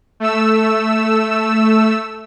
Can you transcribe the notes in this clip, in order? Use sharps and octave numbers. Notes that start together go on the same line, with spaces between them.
A3 E6